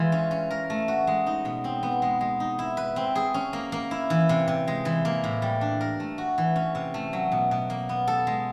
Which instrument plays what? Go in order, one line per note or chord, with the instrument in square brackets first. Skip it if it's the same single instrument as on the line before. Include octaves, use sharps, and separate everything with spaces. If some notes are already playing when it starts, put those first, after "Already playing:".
Already playing: [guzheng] E3 G#3 F4
C#4
C#4
A#4
A3
F#4
G#3
D#4
B2
C4
B3
G#3
G#3
D#4
E4
B4
C4
G#4
C#4
A#3
A#3
E4
E3
C3
C3
G#3
E3
A#3
A2
G3
D4
A#4
A3
F#4
E3
C#4
C3
A3
F#3
B2
B2
A#3
B3
A4
G#3